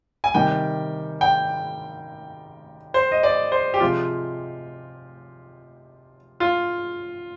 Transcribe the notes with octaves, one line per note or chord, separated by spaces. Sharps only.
G#5
C3 D#3 G3 G5
G5
C5
D#5
D5
C5
G4
C3 F3 G#3 F4
F4